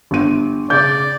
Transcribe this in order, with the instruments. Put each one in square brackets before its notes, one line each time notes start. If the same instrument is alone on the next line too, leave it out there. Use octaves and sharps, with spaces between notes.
[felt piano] G1 D#7
[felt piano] C#3 G6 [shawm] D5